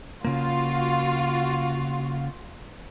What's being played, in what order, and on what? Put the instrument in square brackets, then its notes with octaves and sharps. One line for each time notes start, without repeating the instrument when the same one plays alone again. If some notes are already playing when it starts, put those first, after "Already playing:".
[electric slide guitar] C#3 A#3 [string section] F4 F#4